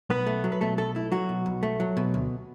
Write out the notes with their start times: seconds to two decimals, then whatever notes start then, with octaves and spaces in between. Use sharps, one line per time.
0.10 B1 B3 B4
0.27 A3
0.44 F#3
0.52 B4
0.61 B2 A3 A4
0.78 B1 A3 A4
0.95 A3 E4
1.12 F#3 F#4
1.29 B2
1.46 B1
1.63 A3
1.80 F#3
1.97 B2
2.14 D2